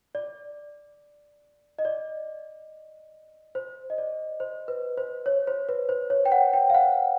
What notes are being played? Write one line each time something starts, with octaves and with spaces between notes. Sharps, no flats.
D5
D#5
D5
C5
D#5
D5
C5
B4
C5
C#5
C5
B4
C5
C#5
G5
F#5
G5
F5
F#5